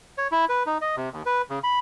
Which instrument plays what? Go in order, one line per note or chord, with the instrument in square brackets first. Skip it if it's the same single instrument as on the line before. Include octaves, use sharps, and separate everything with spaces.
[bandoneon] C#5
E4
B4
D#4
D#5
C3
D#2
B4
C#3
B5